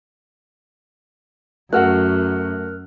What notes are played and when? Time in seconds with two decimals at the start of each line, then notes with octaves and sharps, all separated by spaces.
1.73 F#2 A3 F#4 A#4 F#5 F6 F#6